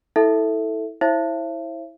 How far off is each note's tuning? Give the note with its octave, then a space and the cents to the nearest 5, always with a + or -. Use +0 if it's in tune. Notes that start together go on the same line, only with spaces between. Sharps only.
E4 -25 A4 +0 E5 +0
E4 -15 C5 +35 E5 +40